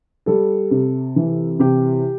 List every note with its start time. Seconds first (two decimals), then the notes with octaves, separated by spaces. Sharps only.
0.26 G3 A4
0.71 C3
1.16 E3
1.59 C3 G4